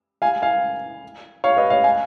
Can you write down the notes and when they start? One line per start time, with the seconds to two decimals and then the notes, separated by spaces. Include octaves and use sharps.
0.22 F5 G#5
0.42 F5 G#5
1.44 C#5 F5
1.57 B4 D#5
1.70 C#5 F5
1.84 F5 G#5